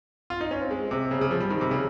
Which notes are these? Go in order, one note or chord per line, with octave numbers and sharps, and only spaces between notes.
F4
D#4
C#4
C4
G#3
C3
C#3
C#3
F3
G3
D#3
C3
C#3